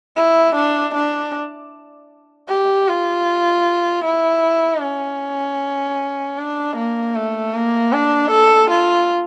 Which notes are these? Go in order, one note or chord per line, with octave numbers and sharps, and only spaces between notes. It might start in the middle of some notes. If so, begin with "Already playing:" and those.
E4
D4
D4
G4
F4
E4
C#4
D4
A#3
A3
A#3
D4
A4
F4